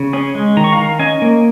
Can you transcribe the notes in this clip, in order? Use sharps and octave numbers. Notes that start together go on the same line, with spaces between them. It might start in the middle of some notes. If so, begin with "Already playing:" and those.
Already playing: C#3
C#4 G#4
G#3
D#3 A#5
C#6
F5 A#5
D#3
C#4 D#5 G#5
A#3